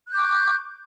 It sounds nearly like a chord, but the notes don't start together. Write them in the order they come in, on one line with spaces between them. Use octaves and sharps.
F#6 G6 D6 C#6